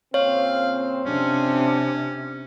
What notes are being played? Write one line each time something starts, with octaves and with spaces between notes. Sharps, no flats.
A#2 C#3 C4 C#5 F5
F2 C3 C#4 D4